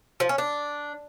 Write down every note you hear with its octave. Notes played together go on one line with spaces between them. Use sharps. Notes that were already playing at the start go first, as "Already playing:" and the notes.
F3
C#4
D4